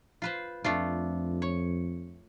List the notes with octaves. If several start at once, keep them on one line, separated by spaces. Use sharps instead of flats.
F4 B4 C5
F2 A3 D4 F4
C#5